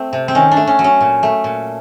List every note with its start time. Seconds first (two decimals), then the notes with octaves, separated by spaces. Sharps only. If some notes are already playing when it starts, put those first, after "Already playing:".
Already playing: A3 C4
0.13 C3
0.28 C4
0.35 D#3 C#4
0.51 D4
0.57 A3
0.67 C#4
0.79 F#3
0.84 C#4
1.01 A#2
1.23 A3
1.44 A#2